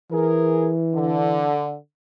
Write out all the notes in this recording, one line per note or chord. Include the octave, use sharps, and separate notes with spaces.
E3 G#4 A#4
D3